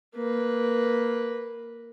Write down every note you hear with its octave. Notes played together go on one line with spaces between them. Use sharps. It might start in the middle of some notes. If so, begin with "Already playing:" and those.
A#3 B4